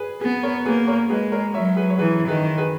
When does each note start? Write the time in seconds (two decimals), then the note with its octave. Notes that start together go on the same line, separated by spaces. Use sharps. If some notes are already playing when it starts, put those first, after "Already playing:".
Already playing: G#4 B4
0.21 B3 G#4
0.43 A#4 C#5
0.65 A#3 G#4 B4
0.88 A#4 C#5
1.10 G#3 G#4 B4
1.32 A#4 C#5
1.54 F#3 C#5 E5
1.76 G#4 B4
1.90 C#5
1.98 E3 G#4 B4
2.28 D#3 G#4 B4
2.58 G#4 B4